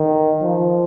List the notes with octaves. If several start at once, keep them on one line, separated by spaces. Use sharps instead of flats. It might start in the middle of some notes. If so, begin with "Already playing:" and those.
Already playing: D#3
F3